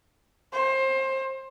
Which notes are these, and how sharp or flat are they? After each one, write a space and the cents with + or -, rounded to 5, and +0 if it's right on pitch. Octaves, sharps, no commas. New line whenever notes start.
C5 +25